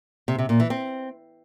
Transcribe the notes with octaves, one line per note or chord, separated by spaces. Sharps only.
C3
C3
A#2
E3
C4